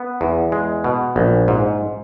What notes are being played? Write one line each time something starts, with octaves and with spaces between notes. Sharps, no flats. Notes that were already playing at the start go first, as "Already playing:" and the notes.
Already playing: B3
E2
G#3
B2
A#1
G#2